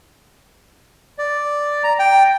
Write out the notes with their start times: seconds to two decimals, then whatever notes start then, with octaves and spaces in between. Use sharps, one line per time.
1.18 D5
1.84 A#5
1.99 G5